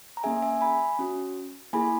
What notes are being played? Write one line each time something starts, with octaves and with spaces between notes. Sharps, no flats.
A#5
A#3 C#4 G#4 E5 G#5
E5 G#5
G#5 B5
C#4 F#4
A#3 E4 G#4 G#5 B5